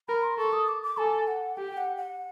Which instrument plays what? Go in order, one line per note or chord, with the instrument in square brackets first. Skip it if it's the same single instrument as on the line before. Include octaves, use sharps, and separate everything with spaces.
[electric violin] A#4 [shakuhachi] B5
[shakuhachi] C6
[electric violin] A4 [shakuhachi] C#6
[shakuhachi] D#6
D6
D6
[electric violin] A4 [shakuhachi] G#5
[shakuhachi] F#5
[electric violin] G4 [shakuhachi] G5
[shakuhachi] F#5
F#5